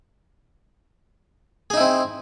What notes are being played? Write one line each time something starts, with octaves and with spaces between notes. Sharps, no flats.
C4 D#4 E4 G#4